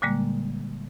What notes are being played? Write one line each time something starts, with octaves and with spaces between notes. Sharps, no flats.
A#2 D3 G3 G#3 A#3